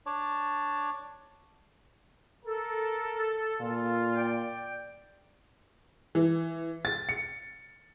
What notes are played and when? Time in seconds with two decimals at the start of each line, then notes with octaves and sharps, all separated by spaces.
0.06 D4 C#5 D5 A5
2.45 A4 A#4
3.61 A#2 F4
4.15 D5 G5
6.15 E3
6.85 A6
7.09 C#7